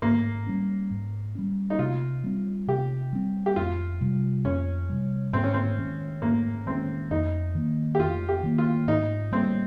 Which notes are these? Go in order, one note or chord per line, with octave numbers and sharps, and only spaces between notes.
G#2 A#3
G3 C#4
G#2
G3 C#4
D#4
C3 F4
G3 C4
C3 G4
G3 C4
G4
F2 F4
C3 G3
F2 C#4
C3 G3
G#2 C4
C#4
C4
D#3 G#3 C#4
G#2 A#3
D#3 G#3 C4 C#4
F2 D#4
D#3 A#3
G4
F2 F4
G4
D#3 A#3
F4
G#2 D#4
G3 A#3 C4